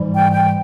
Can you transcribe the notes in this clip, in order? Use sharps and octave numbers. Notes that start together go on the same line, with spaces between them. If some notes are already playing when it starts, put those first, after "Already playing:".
Already playing: G#2 E3 G3
G5
G5